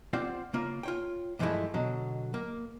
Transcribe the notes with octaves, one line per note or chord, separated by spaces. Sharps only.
C4 F4 C5 D5 F#5 G5
C#3 A#3 F4
F4 C#5 G5
G2 E3 F3 G#3 A3 E4
B2 D3 F#3
A#3